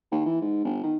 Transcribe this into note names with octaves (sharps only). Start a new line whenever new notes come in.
D#2
E3
G#2
G1
D#3